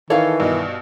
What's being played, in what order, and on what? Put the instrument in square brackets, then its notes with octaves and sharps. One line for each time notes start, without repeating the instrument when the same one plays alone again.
[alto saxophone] D#3 [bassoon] E3 [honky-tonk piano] A4 [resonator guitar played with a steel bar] C#5 F5
[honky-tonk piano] G2 B2 D#4